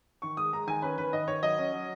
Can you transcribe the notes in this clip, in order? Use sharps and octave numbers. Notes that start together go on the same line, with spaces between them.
D#3 C#6
G#3 D#6
G#3 A#5
D#3 G#5
C#4 B4
D#3 B4
D#3 D#5
D#3 C#5
F#3 D#5
C#4
F#3